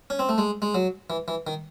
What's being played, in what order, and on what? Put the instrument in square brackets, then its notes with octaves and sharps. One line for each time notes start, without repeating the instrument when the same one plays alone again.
[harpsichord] C#4
C4
A3
G#3
G#3
F#3
E3
E3
D#3